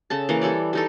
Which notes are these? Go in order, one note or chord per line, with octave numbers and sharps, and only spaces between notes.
C#3 A4 A5
E3 A#3 C#5
G3 A4 C#5 D5
G3 D#4 A4